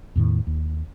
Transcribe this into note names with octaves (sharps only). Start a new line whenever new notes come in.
E2 A2 D#3
D#2